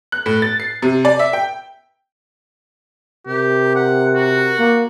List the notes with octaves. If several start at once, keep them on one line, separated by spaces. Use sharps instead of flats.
F#6
A2
A6
C7
C3
D5
E5
G5
C3 G4 A#4
F#5
F#4
A#3